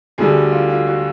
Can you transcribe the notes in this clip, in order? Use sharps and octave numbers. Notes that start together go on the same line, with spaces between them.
D2 D3 G3 G#4
F4
F4
F#4